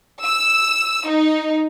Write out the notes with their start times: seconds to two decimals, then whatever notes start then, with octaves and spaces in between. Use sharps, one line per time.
0.24 E6
1.08 D#4